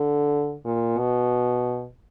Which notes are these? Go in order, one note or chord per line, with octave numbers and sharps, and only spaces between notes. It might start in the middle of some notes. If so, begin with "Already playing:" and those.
Already playing: D3
A#2
B2